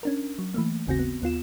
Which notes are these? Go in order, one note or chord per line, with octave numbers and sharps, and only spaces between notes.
C#4 D4 A#4
F#3
E3 A3 A#3
G#1 D#2 C#3 C4 F#4 A#6
B3
D#2 B3 F4 E7